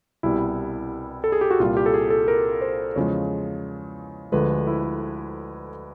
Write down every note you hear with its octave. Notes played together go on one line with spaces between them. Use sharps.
C2 B2 G3 E4
A4
G#4
G4
F#4
C2 A#2 G3 F4
G4
A4
G#4
A4
A#4
C5
E2 C#3 F3 G#3 C#5
D2 D3 F3 G#3 B4
E4